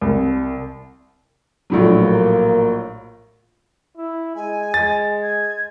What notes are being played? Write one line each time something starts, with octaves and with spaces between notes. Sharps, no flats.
C2
A#1 A2 F#3
A#3
E4
G#3 G#5
G#3 A6
G#6